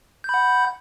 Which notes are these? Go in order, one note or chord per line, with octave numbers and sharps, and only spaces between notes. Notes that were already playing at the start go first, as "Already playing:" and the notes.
F#5 B5 G6